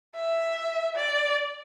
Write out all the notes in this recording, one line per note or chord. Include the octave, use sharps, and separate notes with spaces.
E5
D5